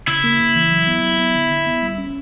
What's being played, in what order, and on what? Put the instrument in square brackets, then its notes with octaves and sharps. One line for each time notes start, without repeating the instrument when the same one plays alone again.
[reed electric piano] C#3 [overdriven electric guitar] E4
[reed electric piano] A#3
C#3
E3
F#3
B3
F#3
B3
D3
D3
B3
G3
C#4